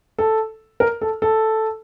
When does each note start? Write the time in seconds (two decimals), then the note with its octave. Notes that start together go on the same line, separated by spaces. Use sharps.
0.18 A4
0.80 A#4
1.01 A4
1.22 A4